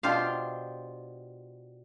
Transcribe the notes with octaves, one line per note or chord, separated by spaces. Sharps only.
B2 D4 F4 G4 C5 F5